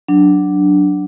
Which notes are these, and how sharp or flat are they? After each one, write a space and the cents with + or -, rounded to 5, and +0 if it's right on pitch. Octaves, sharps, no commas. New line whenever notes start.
F#3 +0 D4 +0